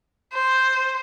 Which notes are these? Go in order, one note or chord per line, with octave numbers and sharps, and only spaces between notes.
C5